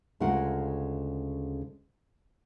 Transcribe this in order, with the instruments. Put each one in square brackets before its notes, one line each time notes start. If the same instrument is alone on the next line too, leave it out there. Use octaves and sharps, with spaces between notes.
[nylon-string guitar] D2 C#3 G#3 F4 A#4 F#5